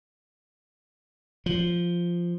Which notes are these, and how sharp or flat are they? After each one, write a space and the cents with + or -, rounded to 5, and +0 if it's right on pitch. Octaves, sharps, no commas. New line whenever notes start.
F3 -5